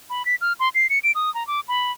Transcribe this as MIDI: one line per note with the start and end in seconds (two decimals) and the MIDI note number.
0.10 0.25 83
0.25 0.35 95
0.41 0.53 89
0.60 0.69 84
0.75 0.87 96
0.90 0.99 97
1.04 1.12 98
1.15 1.33 87
1.35 1.46 82
1.47 1.60 86
1.68 1.92 83